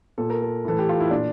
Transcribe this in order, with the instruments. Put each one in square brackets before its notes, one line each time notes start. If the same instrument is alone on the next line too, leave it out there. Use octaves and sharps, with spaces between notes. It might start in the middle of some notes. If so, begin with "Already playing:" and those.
[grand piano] A#2 A4
A#4
A4
A2 E3 A4
G4
F4
E4
A#2 D4